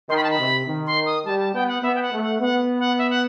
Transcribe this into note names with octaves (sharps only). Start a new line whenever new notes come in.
D#3 C6
B5
A5
B5
C3
D#3
C6
D#6
G3 A5
A5
B3 G5
F#5
B3 E5
G5
F#5
A3
F#5
B3 F#5
F#5
E5
F#5